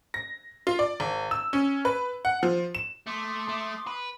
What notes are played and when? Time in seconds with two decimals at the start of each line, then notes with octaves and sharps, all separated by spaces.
0.14 A#6
0.67 F4
0.79 D5
1.00 G#1
1.31 E6
1.53 C#4
1.85 B4
2.25 F#5
2.43 F3
2.75 E7
3.07 A3 C6 D6 D#6
3.48 A3
3.87 B4